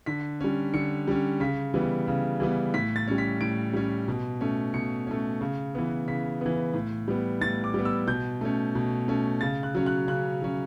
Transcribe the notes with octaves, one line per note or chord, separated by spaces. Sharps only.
D3 B6
G3 C#4
D3 C#7
G3 C#4
C#3 B6
E3 G3 B3
C#3
E3 G3 B3
A2 B6
A6
G3 C#4
B6
A2 D7
G3 C#4
B2
A3 C#4
B2 C#7
A3 C#4
C#3
E3 B3
C#3 B6
E3 B3
A2
G3 B3
A2 A6
D6
G3 B3
E6
B2 G6
A3 C#4
B2
A3 C#4
C#3 A6
F#6
F#3 C#4
F#6
C#3 F#6
F#3 C#4